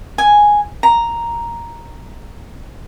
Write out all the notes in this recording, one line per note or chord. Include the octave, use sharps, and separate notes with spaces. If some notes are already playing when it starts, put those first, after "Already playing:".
G#5
A#5